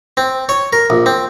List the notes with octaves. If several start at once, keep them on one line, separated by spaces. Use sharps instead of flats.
C4
C#5
A#4
A#1
C4